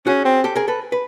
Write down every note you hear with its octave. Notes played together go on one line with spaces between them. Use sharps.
C#4 F#4 G#4
C4
G4 A4
G#4 A#4
A4 B4
B4